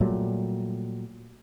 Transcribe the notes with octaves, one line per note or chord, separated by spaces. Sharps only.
A#2 F#3 G3 A3